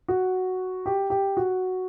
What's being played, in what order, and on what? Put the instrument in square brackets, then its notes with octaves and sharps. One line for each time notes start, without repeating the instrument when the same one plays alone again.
[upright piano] F#4
G4
G4
F#4